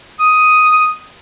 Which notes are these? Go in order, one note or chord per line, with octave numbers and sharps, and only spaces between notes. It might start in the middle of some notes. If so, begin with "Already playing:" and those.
D#6